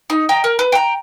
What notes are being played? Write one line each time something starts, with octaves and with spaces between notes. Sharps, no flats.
D#4
D#5 G5 A#5
A#4
B4
G5 A#5